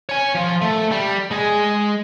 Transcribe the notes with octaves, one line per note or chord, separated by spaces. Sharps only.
C#5 G#5
F3
A3
G3
G#3 G#4